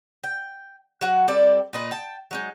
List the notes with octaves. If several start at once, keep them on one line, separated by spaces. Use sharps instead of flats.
G5
F#3 F#4 F#5
G3 C4 A4 D5
A#2 D#4 B4
G5 A5
F#3 G#3 D#4